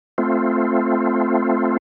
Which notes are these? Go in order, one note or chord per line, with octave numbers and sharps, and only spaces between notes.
A3 C4 F4